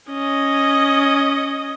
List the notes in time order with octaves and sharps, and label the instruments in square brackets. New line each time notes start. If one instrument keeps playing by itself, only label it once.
[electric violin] C#4 D#5